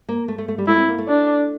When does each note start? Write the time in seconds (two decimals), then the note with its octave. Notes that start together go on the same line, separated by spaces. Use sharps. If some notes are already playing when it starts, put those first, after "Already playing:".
0.09 A#3
0.28 A3
0.38 A3
0.48 A3
0.58 G3
0.68 A3 E4
0.78 C4
0.88 A#3
0.98 A3
1.08 D4